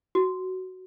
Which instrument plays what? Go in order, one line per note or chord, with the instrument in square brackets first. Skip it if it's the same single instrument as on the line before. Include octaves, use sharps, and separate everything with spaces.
[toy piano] F#4